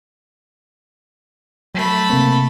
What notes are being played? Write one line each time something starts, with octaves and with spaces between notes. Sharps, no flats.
F#3 A3 B5
C3 A#3 C4